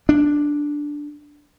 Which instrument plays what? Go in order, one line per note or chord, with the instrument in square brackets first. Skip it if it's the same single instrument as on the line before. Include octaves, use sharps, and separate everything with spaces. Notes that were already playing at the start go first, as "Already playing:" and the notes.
[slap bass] D4